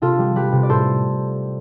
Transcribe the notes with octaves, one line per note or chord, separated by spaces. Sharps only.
C3 F4 A4
G3
G3 G4 B4
C3
D5
A2 A4 C5